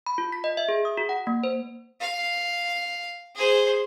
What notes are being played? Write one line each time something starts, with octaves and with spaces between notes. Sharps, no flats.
B5
F4
B6
D#5
E5
G#4
D#6
F#4
F#5
A#3
C5
F5
G#4 C5